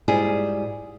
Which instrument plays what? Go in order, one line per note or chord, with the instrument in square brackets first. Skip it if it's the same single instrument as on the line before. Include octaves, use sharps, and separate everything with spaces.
[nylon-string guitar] G#2 G3 E4 F4 G#4